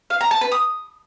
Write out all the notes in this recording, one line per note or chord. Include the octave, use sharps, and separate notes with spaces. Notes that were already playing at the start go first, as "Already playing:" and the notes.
F5
A#5
A5
B4
D#6